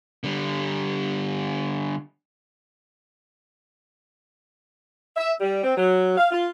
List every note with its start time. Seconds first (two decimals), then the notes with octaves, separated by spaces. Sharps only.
0.24 D3 G3
5.16 E5
5.41 G3
5.64 C4
5.77 F#3
6.18 F5
6.31 F4